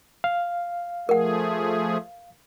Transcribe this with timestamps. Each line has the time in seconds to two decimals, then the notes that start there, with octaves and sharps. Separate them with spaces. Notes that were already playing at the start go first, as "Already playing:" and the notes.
0.24 F5
1.09 F3 A3 G#4 A#4 F#5